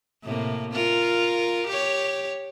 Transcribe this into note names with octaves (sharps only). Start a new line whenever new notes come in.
A2 C3 A#3
F4 A#4
G4 C#5